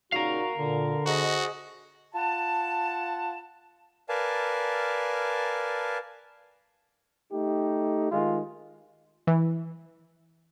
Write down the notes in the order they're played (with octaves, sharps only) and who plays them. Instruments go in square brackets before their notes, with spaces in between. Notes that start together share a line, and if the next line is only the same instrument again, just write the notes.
[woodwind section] A#2 C#3 D#4 [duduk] F#4 [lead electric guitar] A#4 F5
[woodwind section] A#2 [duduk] D3
[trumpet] F#4 [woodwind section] G#4 C5 D#5
[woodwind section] F4 F#5 A5
[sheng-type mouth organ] A#4 B4 D5 F5 G#5 A5
[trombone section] A3 D#4 G4
D#3 G#3 F4
[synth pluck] E3